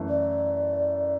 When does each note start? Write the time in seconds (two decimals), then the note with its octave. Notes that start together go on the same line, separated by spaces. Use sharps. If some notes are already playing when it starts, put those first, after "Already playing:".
Already playing: F#2 E3 A3
0.09 D5